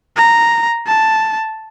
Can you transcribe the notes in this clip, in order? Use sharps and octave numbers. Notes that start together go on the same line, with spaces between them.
A#5
A5